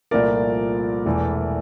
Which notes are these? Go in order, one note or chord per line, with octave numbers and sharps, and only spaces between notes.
C2 A#2 F3 A3 A#4 D5
E1 E2 E3 A3